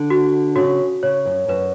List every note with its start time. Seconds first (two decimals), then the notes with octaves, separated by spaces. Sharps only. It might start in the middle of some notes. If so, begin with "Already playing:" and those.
Already playing: D3
0.10 F#4
0.56 C#3 F#4
1.03 C#3 C#5
1.25 F#2
1.48 F#2 B4